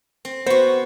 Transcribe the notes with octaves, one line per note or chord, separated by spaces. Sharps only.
C4
B3 F#4 C5